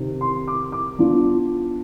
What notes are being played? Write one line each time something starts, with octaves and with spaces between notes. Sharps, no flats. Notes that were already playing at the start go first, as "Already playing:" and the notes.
Already playing: C3 D#3
C6
D6
D6
F3 B3 D4 F4